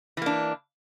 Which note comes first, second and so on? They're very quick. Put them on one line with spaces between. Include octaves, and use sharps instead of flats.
E3 A#3 D4